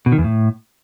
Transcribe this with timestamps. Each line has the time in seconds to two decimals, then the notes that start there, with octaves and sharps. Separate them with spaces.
0.06 B2
0.12 D#3
0.18 E2
0.24 A2